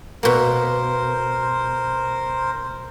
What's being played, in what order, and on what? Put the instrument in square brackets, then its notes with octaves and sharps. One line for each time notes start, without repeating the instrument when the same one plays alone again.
[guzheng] B2 A#3 [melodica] A#4 C5